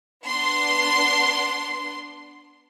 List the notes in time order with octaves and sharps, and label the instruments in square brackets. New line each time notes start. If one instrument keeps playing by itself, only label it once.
[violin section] B3 D4 C6